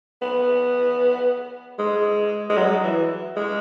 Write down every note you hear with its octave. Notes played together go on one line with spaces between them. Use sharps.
B3
G#3
G#3
F#3
E3
G#3